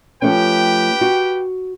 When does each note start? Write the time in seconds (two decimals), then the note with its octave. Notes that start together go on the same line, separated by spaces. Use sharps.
0.22 F3 A3 C#4 G4 B4 G5
1.01 F#4